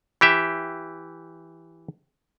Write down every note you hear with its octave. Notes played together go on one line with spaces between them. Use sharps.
E3 G4 E5